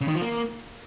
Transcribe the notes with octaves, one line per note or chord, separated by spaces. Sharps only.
C#3
D#3
F3
A#3